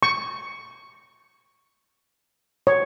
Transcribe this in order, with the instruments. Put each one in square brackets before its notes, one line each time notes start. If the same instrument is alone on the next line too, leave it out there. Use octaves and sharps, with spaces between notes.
[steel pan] C#6
C#5